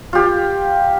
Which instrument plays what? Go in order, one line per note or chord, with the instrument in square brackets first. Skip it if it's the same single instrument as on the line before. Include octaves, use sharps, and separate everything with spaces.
[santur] F4 G4